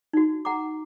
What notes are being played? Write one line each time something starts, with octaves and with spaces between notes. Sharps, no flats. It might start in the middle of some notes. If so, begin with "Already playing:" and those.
D#4 F#4
F#5 A#5 D6